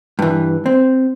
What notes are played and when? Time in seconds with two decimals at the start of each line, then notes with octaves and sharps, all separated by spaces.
0.19 G2 E3
0.66 C4